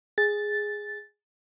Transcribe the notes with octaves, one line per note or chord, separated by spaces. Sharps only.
G#4 A6